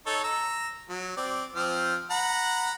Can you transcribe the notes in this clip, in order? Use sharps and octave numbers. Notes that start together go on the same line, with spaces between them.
D#4 A4 C#5
A#5 E6
F#3
C4 D5
F3 C4 F6
F#5 A#5 B5